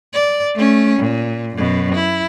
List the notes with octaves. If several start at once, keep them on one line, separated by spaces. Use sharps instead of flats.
D5
A3 C#4
A#2
F#2 B2
E4